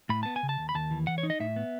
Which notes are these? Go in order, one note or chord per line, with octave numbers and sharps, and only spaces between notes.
A2 B5
B3 A5
G#5
C#3
A5
D#2
B5
D#2 A5
E3
E3 F#5
C#5
D#4
D#5
A2 E5
B3